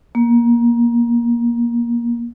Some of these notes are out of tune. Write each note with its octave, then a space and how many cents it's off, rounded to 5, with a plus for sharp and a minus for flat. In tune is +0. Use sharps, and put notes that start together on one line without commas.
A#3 +20